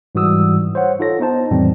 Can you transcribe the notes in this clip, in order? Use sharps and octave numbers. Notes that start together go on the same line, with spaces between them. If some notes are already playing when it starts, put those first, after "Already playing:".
G#2 E3 G3 F#4 D#6 E6
C5 C#5 F#5
D#4 F4 A4 C#5 A#6
B3 D#4 C5 A5
F2 A2 E3 G3 C4